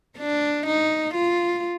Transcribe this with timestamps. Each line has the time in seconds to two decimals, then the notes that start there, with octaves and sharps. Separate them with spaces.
0.18 D4
0.66 D#4
1.14 F4